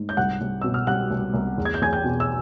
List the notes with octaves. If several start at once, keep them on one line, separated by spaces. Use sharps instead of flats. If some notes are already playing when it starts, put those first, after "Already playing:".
Already playing: G#2
G6
C2 F#5 F#6
C2
B2 E6
F6
G3 F#5 F#6
C2
C2
E2
G#6
G6
E2 G#5 G#6
G5 G6
B2
E6